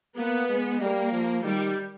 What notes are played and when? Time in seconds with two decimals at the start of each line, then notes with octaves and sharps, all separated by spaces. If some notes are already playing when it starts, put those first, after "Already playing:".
0.17 A#3 B3
0.49 G#3
0.81 G3 A#3
1.12 F3
1.44 D#3 G3